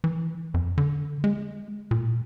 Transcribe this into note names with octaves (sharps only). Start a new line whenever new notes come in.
E3
F2
D3
G#3
A#2